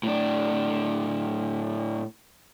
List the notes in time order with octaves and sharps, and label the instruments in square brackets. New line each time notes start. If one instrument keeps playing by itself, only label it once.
[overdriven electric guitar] A2 D4